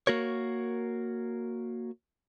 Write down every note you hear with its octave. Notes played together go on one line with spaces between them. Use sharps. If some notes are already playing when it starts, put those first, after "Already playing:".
A#3 F#4 A#4 C#5